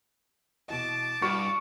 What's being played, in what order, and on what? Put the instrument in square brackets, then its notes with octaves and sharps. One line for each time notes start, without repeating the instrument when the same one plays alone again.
[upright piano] B2 E3 D#5 [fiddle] A5 D6
[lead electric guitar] G2 [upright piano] E4 F#4 F6 [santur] C#6